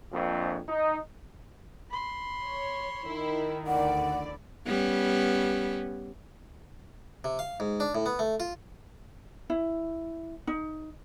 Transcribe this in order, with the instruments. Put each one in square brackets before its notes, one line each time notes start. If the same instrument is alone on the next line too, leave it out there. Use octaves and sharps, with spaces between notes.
[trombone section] A#1 F2
D#4
[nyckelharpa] B5 C6
[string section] C#5
[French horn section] D#3 [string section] E4
[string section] D2 D3 D5 [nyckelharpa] E4 [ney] F#5
[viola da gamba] G3 B3 C#4
[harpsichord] C3
F5
G#2
D4
A2
B3
A3
F4
[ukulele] E4
D#4